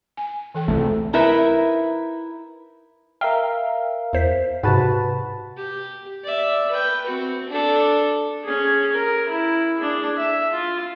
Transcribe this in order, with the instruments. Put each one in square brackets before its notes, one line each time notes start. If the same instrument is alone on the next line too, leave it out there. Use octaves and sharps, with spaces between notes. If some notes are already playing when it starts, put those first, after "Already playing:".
[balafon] G#5
E3 A4 G5
[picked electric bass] C2 A3
[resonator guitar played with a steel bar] D#4 E4 A#4 B4 E5
[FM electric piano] A#4 E5 F5 [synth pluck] G5
[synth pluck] E2 C5 B6
[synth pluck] G#2 C3 [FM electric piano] F#4 B4 A5
[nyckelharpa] G4
D5 E5
B4 G5
C4 F#4
D4 A4
C#4 G#4
A#4
E4
D4 G#4
E5
F4